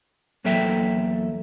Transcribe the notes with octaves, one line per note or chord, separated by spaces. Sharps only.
E2 F#3 A#3 A4 E5 G5